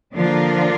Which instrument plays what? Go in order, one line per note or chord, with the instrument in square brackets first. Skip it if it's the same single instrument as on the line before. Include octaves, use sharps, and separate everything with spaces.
[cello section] D3 F3 A#3 D4 F4